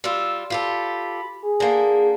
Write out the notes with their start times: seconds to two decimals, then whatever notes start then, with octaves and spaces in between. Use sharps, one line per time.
0.04 G3 F4 E6
0.50 F4 G4 A4 B5
1.43 G#4
1.60 D3 A#3